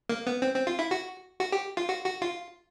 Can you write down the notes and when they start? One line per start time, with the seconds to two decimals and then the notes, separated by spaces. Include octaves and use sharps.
0.09 A#3
0.26 B3
0.42 C4
0.55 C4
0.67 F4
0.79 E4
0.91 F#4
1.41 F#4
1.52 G4
1.77 F4
1.89 F#4
2.05 F#4
2.22 F4